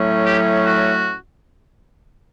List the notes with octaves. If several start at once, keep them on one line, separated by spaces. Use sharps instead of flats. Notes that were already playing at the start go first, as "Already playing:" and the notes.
Already playing: A2 F#3 A3 C#4
G4
F#4